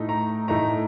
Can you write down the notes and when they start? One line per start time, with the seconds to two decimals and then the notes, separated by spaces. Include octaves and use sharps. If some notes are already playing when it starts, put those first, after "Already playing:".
Already playing: A2 A3 D#4
0.09 A#5
0.48 A2 A3 D#4 A#5